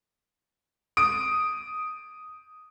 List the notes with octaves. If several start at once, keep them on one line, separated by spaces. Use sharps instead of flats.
D#6 D7